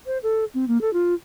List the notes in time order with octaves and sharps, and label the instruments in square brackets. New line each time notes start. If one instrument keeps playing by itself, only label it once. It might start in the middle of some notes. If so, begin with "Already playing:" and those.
[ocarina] C5
A4
C4
A#3
A4
F4